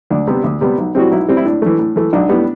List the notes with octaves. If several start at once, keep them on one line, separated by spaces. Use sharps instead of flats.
D2 D4
C3 G3 B3
D2
C3 G3 B3
B1
A2 G3 C4 F#4
B1 E4
A2 G3 C4
E4
A2 D4
E3 A3
A2
E3 A3
B1 D4
A2 G3 B3